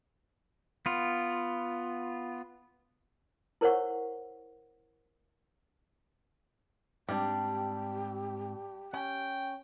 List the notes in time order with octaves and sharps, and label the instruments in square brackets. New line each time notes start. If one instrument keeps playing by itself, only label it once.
[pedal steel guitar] B3 F4
[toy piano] E4 A#4 C5 C#5 F#5 C#6
[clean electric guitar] G#2 C4 [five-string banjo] G3 D4 [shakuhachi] G4
[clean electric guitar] C#4 [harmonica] G5